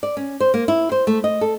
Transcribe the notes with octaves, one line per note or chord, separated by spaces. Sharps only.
D5
C#4
C5
A#3
E4
C5
A3
D#5
A4